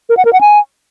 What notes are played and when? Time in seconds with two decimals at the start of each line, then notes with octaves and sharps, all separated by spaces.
0.09 A#4
0.17 F#5
0.25 A#4
0.33 F#5
0.41 G#5